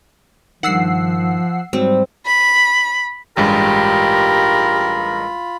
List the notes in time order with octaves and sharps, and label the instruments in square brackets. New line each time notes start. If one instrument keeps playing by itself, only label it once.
[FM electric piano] G2 D#3 [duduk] F3 [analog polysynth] F#5 E6 C7
[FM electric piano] G#2 F#3 [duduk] G3 [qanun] C4
[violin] B5
[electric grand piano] A1 G2 G#3 [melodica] F4 B5 [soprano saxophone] G4 [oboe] A#4